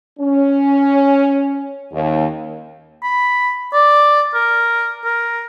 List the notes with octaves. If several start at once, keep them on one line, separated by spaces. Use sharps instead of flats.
C#4
D#2
B5
D5
A#4
A#4